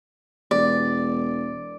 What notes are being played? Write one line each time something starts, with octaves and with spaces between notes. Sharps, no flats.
E1 D5